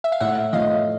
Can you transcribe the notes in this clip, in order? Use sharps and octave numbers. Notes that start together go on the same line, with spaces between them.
E5
F5
A2 E5 F#5
F3 A3 D#5 F5